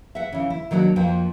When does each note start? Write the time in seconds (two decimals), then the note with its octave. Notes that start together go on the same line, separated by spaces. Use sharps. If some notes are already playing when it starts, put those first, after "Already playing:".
0.15 E5 F#5
0.32 C#3 E3
0.50 E4
0.71 D#3 F#3 A#3 D4
0.96 F2 F3 A#3 G5